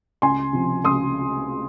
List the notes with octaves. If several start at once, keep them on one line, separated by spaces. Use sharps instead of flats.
C#2 G#5 C6
C3 F3 C4
C#2 C6 D#6